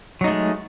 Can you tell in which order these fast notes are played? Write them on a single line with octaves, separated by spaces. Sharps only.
F#3 D#4 A3 G#3